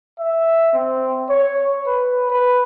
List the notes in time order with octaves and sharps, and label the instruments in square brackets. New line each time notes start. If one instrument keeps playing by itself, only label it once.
[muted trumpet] E5
C4
C#5
B4
B4